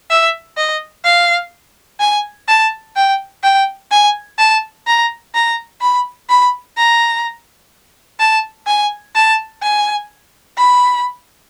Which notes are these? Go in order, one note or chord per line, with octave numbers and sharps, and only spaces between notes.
E5
D#5
F5
G#5
A5
G5
G5
G#5
A5
A#5
A#5
B5
B5
A#5
A5
G#5
A5
G#5
B5